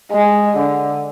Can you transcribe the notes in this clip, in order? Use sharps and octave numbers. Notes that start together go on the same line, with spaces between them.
G#3
D3